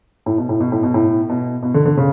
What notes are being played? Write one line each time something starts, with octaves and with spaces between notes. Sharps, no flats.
A2
B2
A2
B2
A2
B2
A2
B2
B2
D3
D3
C#3